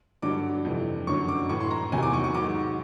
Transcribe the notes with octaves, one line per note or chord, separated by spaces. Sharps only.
G2 D3 F#3 D6
F2 C3 E3
F#2 D3 F#3 C#6
D6
A2 E3 C#6
C6
A#5
E2 C3 D#3 F#3 G#5
D6
C#6
C#6
G#2 D#3 F#3 D6